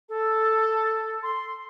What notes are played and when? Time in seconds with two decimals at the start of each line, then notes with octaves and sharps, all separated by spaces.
0.09 A4
1.23 C6